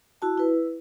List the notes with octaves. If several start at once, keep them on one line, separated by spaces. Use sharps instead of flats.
E4 F#4 A5
E4 B4